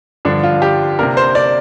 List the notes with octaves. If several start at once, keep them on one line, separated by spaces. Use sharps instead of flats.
G2 D3 F3 D4
F4
G4
C3 A#3 D4 A#4
C5
D5